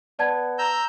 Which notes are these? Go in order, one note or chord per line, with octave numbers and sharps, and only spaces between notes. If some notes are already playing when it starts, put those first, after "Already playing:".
B3 D5 A5 G#6
A#5 E6 G6